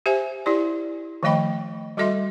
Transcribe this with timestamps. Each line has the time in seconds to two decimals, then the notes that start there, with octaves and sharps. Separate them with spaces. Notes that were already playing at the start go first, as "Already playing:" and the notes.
0.06 G4 C5 E5 G#5
0.46 E4 G4 D5
1.23 D#3 F3 A3 D#5 G5 B5
1.97 G3 F#4 A4 D#5 E5 C6